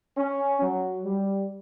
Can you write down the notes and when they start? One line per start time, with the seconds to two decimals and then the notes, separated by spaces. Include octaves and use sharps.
0.18 C#4
0.61 F#3
1.05 G3